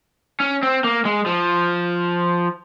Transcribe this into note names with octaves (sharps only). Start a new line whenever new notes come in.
C#4
C4
A#3
G#3
F3